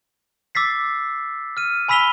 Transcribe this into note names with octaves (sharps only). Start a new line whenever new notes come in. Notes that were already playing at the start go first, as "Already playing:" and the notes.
D6 E6 A6 B6 C7
F6 D#7
G#5 B5 E6 B6 F7 G7